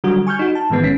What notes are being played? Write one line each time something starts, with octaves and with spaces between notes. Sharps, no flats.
D3 F#3 G3 F#4
G#5 C#6 F6 G6
D#4 F#4
A5
G#2 D#3 E3 G#3 B3
B1 C#4 B6